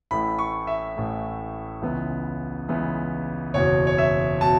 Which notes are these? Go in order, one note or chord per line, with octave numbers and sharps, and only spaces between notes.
A1 A2 A3 B5
C#6
E5
A1 A2 A3
C#2 C#3 E3 B3
C#2 C#3 E3 B3
F#1 E2 B2 C#5
C#5
E5
B2 A5